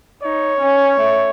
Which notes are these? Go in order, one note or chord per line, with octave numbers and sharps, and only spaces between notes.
D#4 C#5
C#4
A3